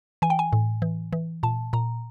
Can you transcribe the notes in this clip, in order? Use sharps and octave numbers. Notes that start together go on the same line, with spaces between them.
E3 G#5
G5
G#5
A2
E3
E3
A#2 A5
A#2 A#5